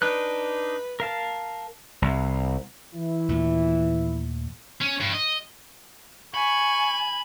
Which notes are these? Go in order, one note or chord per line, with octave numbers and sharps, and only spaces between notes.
D4 D#4 B4 F#6
A#4 F5 A5
C2
E3 E4
D#2 A#2 A3
C#4
G2
D#5
G#5 B5 C#6